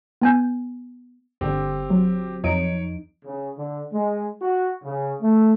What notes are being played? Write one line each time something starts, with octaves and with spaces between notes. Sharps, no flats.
B3 G#5 G6
G1 D3 C4 G4
F#3
F2 D#4 C#5 D7
C#3
D3
G#3
F#4
C#3
A3